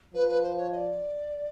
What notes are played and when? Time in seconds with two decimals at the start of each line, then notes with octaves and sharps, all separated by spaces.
0.14 F3 B4
0.28 B4
0.42 C5
0.57 C#5
0.71 D#5
0.76 D5